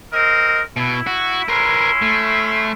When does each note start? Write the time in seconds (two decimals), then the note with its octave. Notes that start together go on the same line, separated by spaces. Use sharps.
0.12 C4 A#4 D#5
0.77 B2 E4
1.07 F#4
1.48 C#4 E4 A#4 B4 C6
2.02 A3